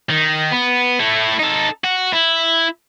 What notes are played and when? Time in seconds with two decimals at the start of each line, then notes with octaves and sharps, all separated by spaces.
0.09 D#3
0.52 B3
0.99 A3 E4
1.39 D#4 A4
1.84 F#4
2.13 E4